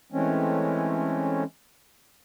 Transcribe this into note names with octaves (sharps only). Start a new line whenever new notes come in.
E3 G#3 A3 C4 C#4